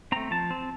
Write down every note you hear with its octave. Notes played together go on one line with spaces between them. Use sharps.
A3 C4 A#5
F3 A5
C4